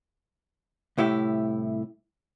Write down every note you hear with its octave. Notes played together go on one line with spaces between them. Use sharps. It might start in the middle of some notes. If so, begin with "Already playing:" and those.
C2 A2 E4 G4